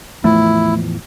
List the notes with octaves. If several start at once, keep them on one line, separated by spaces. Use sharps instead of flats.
E2 A2 F3 A3 E4